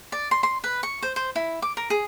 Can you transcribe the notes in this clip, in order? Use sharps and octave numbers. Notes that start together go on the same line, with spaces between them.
D5
C6
C6
B4
C#6
C5
C5
E4
D6
A#4
G#4